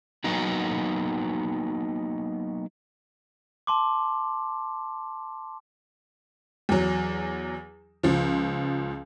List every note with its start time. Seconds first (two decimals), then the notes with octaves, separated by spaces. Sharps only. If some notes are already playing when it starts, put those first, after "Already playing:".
0.24 F#3 A#3 B3 D#4 F#4
3.67 A5 C6 D6
6.69 E2 F#3
8.03 C#2 F3